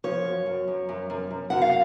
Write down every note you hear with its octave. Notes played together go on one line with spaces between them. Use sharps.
F3 C#5
F#2
F#2
F#2
F#2
F#2
F#2
F#2 F#5
F5